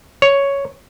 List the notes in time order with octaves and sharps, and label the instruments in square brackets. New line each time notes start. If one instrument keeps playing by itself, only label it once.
[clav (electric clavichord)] C#5